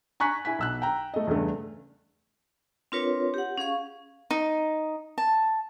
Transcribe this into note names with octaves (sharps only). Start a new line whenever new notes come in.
G#5 A#5 C#6 F#6 B6
E4 G#5 B6
B1 E6 F#6
G5 A#5
A3 D#5
E2 G2 C#3 A3
C4 D4 F4 A#4 B4 C#5
G4 F#5
C#4 G#4 F5 C#6
D#4
A5